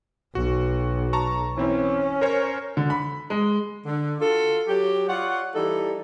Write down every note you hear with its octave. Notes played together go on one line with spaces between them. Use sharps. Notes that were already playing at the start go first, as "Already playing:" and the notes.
B1 F#4
A5 A#5 C#6
E3 C4 C#4 E4
A#4 C5 C#5
D3
B5
G#3
D3
F4 F#4 A4
F#3 G4
F4 C#5 D5 F#5
E3 G3 D#4 A4